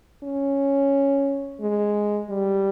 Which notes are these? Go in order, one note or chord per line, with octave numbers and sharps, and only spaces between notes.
C#4
G#3
G3